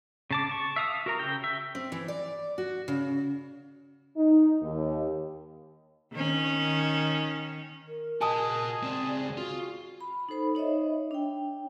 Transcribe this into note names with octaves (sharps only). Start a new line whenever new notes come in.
C#3 A5 D6
A5 C#6
E5 F5 D#6 E6
F#4 A#4 A#5
C#3 G5
E5
C4
E3
D5
F#4
C#3
D#4
D#2
D#3 C#4
A#4
F#4 G#4 D#5 G#5 A5 D#6
C#2 C4 D5
F4 F#4
B5
D#4 A4 C5 B5
D#4 C#5 D#5 E5
D4 G5